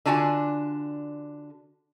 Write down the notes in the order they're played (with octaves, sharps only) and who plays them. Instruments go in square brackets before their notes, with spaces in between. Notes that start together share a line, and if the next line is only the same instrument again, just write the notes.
[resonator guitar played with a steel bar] D3 D4 F4 F#4 F#5 G#5